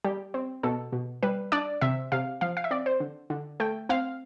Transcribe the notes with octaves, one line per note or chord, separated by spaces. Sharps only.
G3 G4
C4
B2 A4
B2
G3 B4
D4 D5
C3 E5
C3 F5
F3 F5
F5
E5
C4 D5
C5
D3
D3
A3 G5
C4 F5